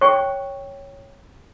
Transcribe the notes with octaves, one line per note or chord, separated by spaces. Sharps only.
C#5 G5 C#6